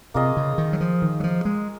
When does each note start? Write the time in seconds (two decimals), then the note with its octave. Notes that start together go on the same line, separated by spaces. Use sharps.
0.14 C3 A#3 F4 G#4 D#5
0.37 C#3
0.58 D#3
0.73 F#3
0.81 F3
1.02 D#3
1.20 F#3
1.24 F3
1.45 G#3